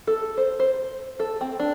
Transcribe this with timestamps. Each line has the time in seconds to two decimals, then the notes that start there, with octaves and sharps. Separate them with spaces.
0.07 A4
0.37 C5
0.60 C5
1.20 A4
1.41 C4
1.60 D4